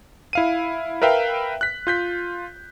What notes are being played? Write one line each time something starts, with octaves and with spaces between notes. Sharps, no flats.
E4 F5 D#7
A#4 B4 E5 F5 G5
F#6 B6
F4 G6 B6